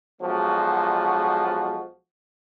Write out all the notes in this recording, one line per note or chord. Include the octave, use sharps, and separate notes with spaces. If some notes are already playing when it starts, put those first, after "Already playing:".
B1 F3 G#3 F#4